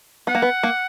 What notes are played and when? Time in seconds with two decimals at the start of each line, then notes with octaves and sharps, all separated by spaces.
0.27 B3 F#5
0.35 A#3
0.42 B3
0.63 A#3